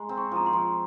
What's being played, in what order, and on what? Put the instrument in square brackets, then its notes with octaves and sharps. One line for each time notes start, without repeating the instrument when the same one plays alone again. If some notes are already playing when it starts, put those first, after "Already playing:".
Already playing: [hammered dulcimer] G#3 [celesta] A#5 C6
[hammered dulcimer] C4
[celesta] C#6
[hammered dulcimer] F3 [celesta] A#5
[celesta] C6
[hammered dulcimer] F3